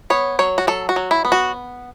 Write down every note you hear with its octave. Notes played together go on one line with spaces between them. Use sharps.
B3 C#5
F#3 C#5
F#4
F#3 A4
F#4
F#3
E4
B3
F#4